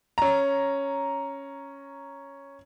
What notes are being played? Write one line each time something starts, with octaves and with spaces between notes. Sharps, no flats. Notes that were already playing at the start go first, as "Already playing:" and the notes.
C#4 A#5